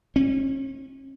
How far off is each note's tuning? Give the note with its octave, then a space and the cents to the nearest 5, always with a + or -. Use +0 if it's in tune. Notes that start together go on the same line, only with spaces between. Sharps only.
C#4 -40